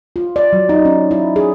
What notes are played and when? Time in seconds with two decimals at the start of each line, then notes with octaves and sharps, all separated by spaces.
0.16 F4
0.36 D5
0.53 F#3
0.69 D#4
0.85 C#4
1.11 E4
1.36 G#4